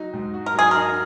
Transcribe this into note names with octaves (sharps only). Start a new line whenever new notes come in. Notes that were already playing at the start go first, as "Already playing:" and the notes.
Already playing: F#3 D#4 F#4
G#2
F#4
A#4
F#3 G#4
D#4 A#4